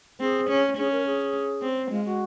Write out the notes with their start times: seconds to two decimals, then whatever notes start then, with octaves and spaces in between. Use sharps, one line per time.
0.20 C4 G#4
0.49 C#4
0.77 C#4 G#4
0.92 A#4
1.06 G#4
1.62 C4
1.91 G#3 F4
2.05 F#4